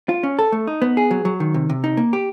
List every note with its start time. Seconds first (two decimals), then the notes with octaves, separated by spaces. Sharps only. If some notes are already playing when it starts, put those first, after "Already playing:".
0.09 F4
0.23 C#4
0.39 A4
0.52 A3
0.67 D#4
0.82 B3
0.97 G#4
1.11 F#3
1.25 F#3
1.40 D#3
1.54 C3
1.69 C3
1.84 D#4
1.97 A#3
2.13 G4